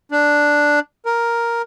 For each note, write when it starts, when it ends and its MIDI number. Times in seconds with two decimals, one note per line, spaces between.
0.12 0.79 62
1.06 1.62 70